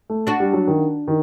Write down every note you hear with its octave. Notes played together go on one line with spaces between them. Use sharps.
A3
D4 F#4
G3
F#3
D#3
D#3